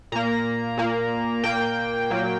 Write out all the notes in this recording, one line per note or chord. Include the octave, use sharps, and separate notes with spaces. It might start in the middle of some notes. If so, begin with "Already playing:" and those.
A#2 A#3 A#5
A#2 A#3
A#2 A#3 G5
A#2 F#3 A#3